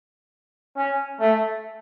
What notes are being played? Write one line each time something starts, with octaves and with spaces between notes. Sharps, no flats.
C#4
A3